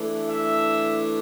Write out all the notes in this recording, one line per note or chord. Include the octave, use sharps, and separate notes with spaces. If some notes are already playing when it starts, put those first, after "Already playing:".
Already playing: E3 A3 D4
E5